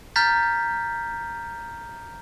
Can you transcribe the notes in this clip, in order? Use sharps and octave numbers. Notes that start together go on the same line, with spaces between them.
A#5 F6 G6 A6 B6